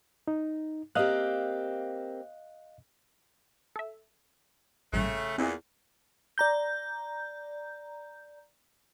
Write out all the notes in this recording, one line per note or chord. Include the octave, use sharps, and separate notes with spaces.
D#4
A#3 C4 G4 D#5 F5 F#6
A4 E5
A1 G2 A#2 C#3 A3
E2 A#2 C4 E4 G#4
D5 A#5 G6